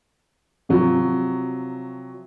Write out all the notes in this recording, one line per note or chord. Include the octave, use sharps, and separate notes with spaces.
C3 F3 F#3